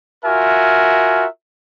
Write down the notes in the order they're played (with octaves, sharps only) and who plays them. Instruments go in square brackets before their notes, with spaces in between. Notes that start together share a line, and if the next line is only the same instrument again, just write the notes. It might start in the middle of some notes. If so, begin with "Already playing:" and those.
[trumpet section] F4 F#4 A#4 E5 G#5